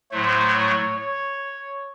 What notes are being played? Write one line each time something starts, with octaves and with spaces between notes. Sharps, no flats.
A2 F#3 A3 C5
C#5
C#5